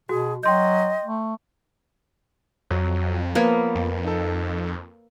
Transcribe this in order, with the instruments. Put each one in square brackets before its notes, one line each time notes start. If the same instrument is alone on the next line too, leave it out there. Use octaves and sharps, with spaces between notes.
[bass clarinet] B2 [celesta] F#4 [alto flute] G#4
[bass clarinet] F#3 [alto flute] D#5 [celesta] G5 C6 G6
[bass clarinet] A3
[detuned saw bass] F2 [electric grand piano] F#3
[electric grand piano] F3 B3 [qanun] A#3 B4 C#5
[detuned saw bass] F2
[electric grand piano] D#4 A4